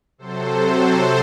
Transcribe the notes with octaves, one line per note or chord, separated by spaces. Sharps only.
C3 F#3 A4 C5
A4 C5